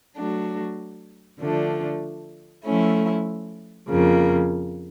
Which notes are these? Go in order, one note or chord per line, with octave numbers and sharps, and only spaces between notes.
F#3 A3 D4 F#4
D3 F3 A3 D4
F3 A3 C#4 E4
F2 C#3 F3 A#3